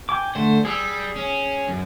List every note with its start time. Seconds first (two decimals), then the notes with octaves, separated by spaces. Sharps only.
0.09 G5 G#5 D6
0.35 D3 A3 C5
0.65 G3 G#4 D#6 E6
1.16 C#4
1.68 F#2